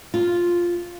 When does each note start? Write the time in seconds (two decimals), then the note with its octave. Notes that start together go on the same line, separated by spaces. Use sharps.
0.14 F4